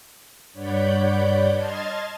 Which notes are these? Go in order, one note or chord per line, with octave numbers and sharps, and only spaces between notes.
G2 C#5 D5 F#5 B5 G6
D#5 A5 C6 F6 G#6 A6